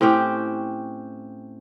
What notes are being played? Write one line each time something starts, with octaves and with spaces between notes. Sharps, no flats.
A2 C4 C#4 G4